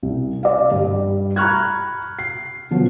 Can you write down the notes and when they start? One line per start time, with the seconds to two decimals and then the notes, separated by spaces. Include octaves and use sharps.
0.03 C2
0.43 D5 F5
0.72 G2 G3
1.36 A#5 B5 C#6 F6 F#6 G#6
2.19 C7
2.71 B2 F3 F#3 B3 C#4